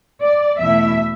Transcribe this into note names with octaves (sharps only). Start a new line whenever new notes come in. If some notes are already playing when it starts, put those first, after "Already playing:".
D5
E2 B2 A3 E4 E5